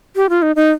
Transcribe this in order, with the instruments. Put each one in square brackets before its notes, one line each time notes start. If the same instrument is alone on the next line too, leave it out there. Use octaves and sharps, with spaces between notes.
[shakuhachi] G4
F4
D#4
D#4